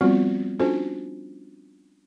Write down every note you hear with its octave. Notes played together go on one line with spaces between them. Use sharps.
F3 G3 B3 C4 F4 F#4
C#4 D4 F4 F#4 A4 C5